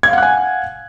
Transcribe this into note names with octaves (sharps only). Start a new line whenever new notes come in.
F5 F#5 G#5 F#6 G#6